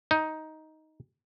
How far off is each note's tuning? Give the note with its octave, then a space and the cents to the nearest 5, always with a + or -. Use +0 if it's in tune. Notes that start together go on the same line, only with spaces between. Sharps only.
D#4 +10